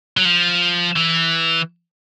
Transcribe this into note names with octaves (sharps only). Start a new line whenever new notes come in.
F#3
F3
E3